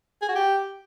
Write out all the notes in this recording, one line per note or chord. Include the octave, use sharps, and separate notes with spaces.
G#4
F#4
G4